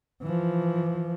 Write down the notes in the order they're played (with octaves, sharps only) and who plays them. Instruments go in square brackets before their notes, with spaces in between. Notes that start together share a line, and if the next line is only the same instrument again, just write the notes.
[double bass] E3 F3